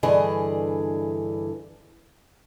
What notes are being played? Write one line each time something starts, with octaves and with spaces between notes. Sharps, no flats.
G2 D3 E3 G#4 D#5